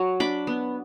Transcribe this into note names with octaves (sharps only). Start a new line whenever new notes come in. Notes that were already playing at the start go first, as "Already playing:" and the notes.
Already playing: F#3
D4 B5 D6
B3